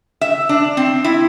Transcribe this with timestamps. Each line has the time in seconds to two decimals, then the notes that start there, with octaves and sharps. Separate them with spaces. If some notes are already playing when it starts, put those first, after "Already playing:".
0.21 E5
0.49 D4
0.77 C4
1.04 E4